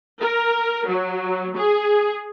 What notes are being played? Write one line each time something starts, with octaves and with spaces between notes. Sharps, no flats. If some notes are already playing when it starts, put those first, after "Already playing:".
A#4
F#3
G#4